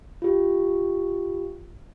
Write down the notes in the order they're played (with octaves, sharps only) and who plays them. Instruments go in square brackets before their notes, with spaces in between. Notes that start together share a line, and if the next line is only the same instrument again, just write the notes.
[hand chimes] F4 G4